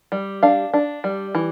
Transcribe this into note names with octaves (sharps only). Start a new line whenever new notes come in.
G3
D4 F5
D4
G3
E3